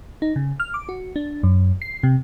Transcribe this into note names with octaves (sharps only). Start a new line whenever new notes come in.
D#4
C#3
F6
D6
F#4
D4
F#2
C7
C3